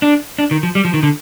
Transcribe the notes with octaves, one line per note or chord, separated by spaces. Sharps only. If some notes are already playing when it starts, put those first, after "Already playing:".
D4
D4
D#3
F3
G3
F3
D#3
D3